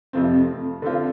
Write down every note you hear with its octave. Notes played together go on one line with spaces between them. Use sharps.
F2 C3 F3 A3 C4
D3 A3 C4 F4